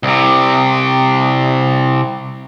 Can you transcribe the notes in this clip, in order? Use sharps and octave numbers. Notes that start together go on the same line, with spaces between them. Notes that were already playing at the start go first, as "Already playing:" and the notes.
C2 C3